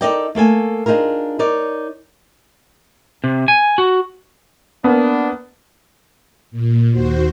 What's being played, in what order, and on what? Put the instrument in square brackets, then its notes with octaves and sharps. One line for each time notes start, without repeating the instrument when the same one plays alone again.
[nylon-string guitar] D#4 A4 A#4 D5 D#5 G5
A3 A#3 A4 G#5
D4 D#4 F4 G#4 A#4
D#4 A#4 C#5 D5
[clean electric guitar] C3
G#5
F#4
[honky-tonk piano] A#3 B3 [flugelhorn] D4
[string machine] A#2
D#2 F#4 C5